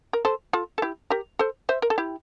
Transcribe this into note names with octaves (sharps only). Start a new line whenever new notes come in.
A#4
A4 C5
F4 A4
A4
E4 G4
G4 A#4
A4 C5
C5 E5
A#4
A4
E4 G4